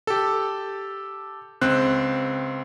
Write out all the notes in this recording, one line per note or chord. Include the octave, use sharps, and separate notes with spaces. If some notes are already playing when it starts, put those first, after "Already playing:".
G4 A4
C#2 C4 F#6